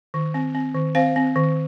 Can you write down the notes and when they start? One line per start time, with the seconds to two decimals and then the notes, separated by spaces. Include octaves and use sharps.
0.14 D#3
0.34 C4
0.55 C4
0.75 D#3
0.95 C4 C5 F5
1.16 C4
1.36 D#3